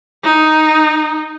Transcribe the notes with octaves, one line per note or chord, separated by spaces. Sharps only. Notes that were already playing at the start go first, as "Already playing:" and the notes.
D#4